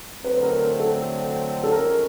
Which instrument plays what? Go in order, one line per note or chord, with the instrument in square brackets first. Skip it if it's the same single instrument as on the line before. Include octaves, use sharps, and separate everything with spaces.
[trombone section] D3 F#3 A3 C4 [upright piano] B4
[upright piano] A#4
A4
A4
[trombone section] F3 G#3 C#4 [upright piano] A#4